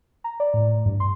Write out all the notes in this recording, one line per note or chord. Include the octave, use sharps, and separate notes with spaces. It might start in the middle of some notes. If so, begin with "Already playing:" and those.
A#5
D5
A2
G2
C6